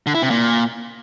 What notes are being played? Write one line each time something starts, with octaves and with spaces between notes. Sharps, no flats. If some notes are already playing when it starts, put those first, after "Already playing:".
D3
E4
C3
A#2